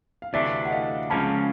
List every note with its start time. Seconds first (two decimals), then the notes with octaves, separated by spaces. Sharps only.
0.22 F5
0.33 D2 C3 E3 A3 D4 D5 E5
0.65 F#5
0.71 D#5 F5
1.10 C#2 C#3 F3 A#3 C#4 A5 B5